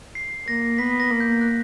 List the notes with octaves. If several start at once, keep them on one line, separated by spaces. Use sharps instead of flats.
C7
A#3 A#6
B3 B6
A#6
A#3
G6
F#6